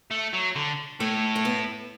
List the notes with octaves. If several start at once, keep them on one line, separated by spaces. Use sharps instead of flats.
A3
F#3
D3
A2 A3
A3
B3